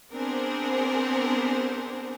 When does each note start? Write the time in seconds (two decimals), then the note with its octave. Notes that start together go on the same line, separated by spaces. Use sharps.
0.12 B3 C4 D4 G#4 A#4 C5